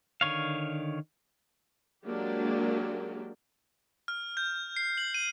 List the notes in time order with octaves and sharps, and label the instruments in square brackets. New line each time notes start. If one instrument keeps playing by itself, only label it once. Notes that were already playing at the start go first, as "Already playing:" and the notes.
[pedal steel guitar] D3 D#3 C#5 F5
[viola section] F#3 G#3 A#3 D4 G4
[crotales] F6
G6
C7
F#7
D#7